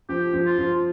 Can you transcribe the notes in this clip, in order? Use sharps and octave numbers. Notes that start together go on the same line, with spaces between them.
F3 G4
F3
F4
F3